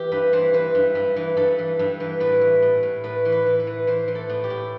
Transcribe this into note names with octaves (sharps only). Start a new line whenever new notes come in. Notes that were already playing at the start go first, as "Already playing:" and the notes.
Already playing: E3 G4
G2 B4
E3 C5
E3 B4
G2
G2
E3
G2 A4
E3
G2
E3
A2 B4
E3
A2
A2
A2 B4
E3
B4
E3
B4
E3
E3 C5
E3
A4
A2
G4
A2